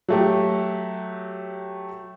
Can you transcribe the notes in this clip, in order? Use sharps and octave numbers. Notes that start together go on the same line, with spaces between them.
F#3 A3 G4